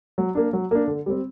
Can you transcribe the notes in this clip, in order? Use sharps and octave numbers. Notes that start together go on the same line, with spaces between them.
F#3
A#3 D4
F#3
A#3 D4
D3
G3 C4